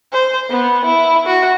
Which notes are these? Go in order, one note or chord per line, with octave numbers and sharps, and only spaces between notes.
C5
B3
E4
F#4